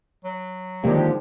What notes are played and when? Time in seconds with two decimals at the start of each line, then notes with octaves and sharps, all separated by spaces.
0.25 F#3
0.84 G#2 D3 D#3 F3 G3 G#3 A#3 G4